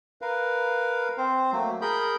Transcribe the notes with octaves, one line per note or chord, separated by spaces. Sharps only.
A#4 B4 F5
C4 C5
F#3 A3 A#3
G#4 A#4 B5 G6